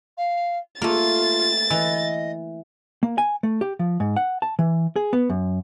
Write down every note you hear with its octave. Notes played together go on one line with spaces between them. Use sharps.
F5
A3 A#3 F4 A6
E3 D#5
A#3
G#5
A3
G4
F3
G#2
F#5
A5
E3
G#4
B3
F#2